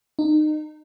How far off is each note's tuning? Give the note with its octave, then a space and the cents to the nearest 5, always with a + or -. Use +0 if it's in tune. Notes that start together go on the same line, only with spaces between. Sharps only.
D#4 -30